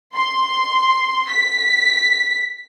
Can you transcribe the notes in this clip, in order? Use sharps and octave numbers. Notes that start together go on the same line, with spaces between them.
C6
B6